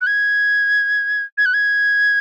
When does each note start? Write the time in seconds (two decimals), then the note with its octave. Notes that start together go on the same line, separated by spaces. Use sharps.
0.01 F#6
0.07 G#6
1.38 G#6
1.46 F#6
1.54 G#6